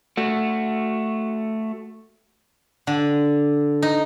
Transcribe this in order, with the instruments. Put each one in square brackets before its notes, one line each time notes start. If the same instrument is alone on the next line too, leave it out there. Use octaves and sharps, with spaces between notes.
[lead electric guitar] A3 F#4
[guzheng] D3
D#4